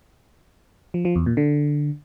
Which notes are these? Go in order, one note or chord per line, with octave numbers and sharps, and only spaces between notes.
F3
F3
E2
A#2
D3